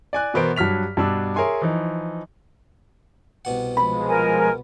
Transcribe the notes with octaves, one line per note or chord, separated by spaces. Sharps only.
D5 G#5 F#6
B2 E3 B3 A#4 C5 D7
G2 F#3 F6 B6 F7
G2 B2 D4 E6
G#4 A#4 C#5 E5 G#5 C6
E3 F3 D#4
C2 B2 F#5
F3 G#3 B5
A#4 G#5